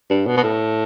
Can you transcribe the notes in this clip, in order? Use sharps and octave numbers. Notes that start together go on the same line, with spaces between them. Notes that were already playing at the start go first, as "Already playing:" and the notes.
G2
B2
B2
A2